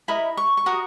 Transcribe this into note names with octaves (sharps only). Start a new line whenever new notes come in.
E4 A#4 D#5 B5
C#6
C#6
F#4 A#4 D#6